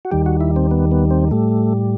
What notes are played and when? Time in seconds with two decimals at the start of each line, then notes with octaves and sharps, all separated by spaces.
0.05 F#4
0.11 D#2 D#3 G3 G4
0.26 F#4
0.41 E4
0.56 C4
0.71 B3
0.91 B3
1.11 C4
1.31 A2 G3 A3